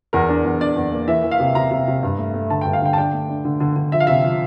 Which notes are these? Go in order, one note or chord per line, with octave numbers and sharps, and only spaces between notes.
E2 A#4
D4
E2
D4 D5
E2
A#3
E3 E5
E3
F5
C3
C3 A#5
C3
C3
G2
A3
A3
D3 A5
G2 G5
F5
D3 G5
A5
D4 G5
A3
D4
D3
D3
D3
F3 E5
F5
C3 E5
F3